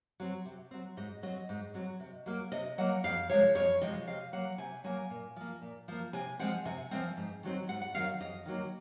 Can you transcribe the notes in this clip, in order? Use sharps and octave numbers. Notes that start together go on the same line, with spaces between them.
F#3 C4
C3
F#3 C4
G#2 D#5
F#3 C4 D#5
G#2
F#3 C4
C3
F#3 A#3
C3 D#5
F#3 A#3 F#5
F2 F5
C3 F3 G#3 C#5
F2 C#5
C3 F3 G#3 D#5
C3 F5
F#3 A#3 F#5
C3 G#5
F#3 A#3 G#5
A#2
F3 A#3
A#2
F3 A#3
C3 G#5
F3 G#3 C4 F#5
C3 G#5
F3 G#3 C4
G#2
D#3 F#3 C4
G#2 F#5
F#5
D#3 F#3 C4 F5
F2 D#5
D#3 F#3 A#3